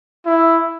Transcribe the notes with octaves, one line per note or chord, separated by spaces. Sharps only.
E4